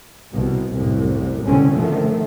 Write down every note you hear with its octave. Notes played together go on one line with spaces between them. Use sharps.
C2 B2
C2 F#2 A2
C2 G#2 B2 D3 C4 C#4
D3 D#3 F3 A3